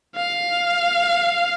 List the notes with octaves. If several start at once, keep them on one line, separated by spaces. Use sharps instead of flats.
F5